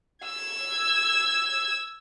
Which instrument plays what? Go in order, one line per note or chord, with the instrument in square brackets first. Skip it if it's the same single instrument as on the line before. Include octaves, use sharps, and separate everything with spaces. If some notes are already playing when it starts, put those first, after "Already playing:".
[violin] E6 G#6